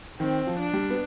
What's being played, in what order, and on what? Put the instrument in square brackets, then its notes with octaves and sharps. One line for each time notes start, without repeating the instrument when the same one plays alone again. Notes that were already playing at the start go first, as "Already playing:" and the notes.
[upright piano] D#3 [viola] C4
[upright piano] F3
[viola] D4
[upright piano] G3
B3